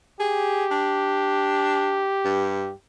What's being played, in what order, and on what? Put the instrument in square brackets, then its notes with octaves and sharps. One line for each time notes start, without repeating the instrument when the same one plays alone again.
[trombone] G4 [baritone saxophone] G#4
[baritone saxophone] D4
G2